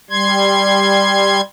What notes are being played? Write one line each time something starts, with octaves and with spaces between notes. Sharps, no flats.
G3 C6 G#6